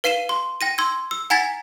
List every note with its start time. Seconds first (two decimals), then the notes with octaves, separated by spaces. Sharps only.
0.04 B4 F5 C7 D#7 E7 G7
0.29 C6
0.61 G5 A#6 D#7
0.78 C6 E6 G#6
1.11 E6
1.30 F#5 G#5 A#5 G#6 A6 B6